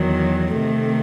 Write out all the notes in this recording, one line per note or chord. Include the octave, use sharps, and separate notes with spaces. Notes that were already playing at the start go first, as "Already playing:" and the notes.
Already playing: E2 D#3 F#3
C3 D#3 A3